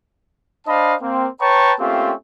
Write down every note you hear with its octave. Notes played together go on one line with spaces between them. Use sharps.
D4 C5 D#5 F5 A5 B5
A#3 C4
B4 C#5 G5 A5 A#5 C#6
A3 A#3 C4 C#4 F4 G4